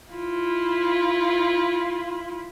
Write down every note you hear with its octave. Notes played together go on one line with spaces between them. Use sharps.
E4 F4